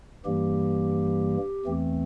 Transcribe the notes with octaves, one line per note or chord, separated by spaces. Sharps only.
G2 E3 G3 A#3 G4
E2 E3 A3 C4